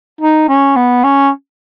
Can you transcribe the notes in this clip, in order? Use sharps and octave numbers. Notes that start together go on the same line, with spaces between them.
D#4
C#4
B3
C#4